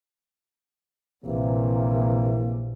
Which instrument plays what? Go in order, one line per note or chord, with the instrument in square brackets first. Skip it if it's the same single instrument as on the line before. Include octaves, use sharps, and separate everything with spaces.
[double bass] A#1 [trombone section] C3 E3 A#3